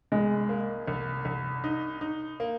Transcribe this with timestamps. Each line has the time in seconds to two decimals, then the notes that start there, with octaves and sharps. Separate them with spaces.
0.12 C2 G#3
0.49 A#3
0.88 C2
1.25 C2
1.64 D#4
2.01 D#4
2.40 A#3